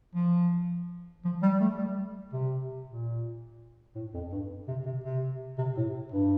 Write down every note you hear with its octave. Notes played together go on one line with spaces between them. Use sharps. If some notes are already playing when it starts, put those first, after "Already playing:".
F3
F3
G3
A3
G3
C3
A#2
A2
F2
G2
C3
C3
C3
C3
A2
G2